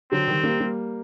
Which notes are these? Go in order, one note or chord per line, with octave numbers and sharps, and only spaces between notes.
D3 F#3 C4
D#3 G3
G3 A#3
G3 A#3